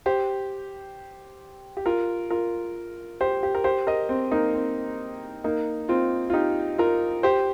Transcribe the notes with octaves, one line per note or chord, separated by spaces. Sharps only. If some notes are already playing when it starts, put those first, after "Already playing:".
G4 C5
G4
F4 A#4
F4 A#4
G4 C5
G4
A#4
G4 C5
A#4 D#5
C4
A#3 D#4
C4
A#3 D#4
C4 F4
F4
D#4 G4
F4 A#4
G4 C5